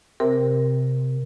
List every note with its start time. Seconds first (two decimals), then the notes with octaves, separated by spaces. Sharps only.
0.20 C3 A#4